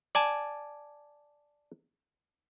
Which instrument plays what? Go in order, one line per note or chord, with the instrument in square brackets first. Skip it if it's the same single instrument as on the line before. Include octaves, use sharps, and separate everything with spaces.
[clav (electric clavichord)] D5 G#5 A5